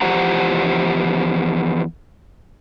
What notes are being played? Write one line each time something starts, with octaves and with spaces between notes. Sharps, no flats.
E2 F3 G4 C5 F#5 A#5